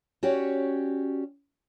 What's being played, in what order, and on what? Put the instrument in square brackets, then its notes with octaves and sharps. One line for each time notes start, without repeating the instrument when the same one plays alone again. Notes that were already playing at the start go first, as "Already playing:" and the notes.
[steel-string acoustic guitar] C#4 F#4 G4 C#5 D5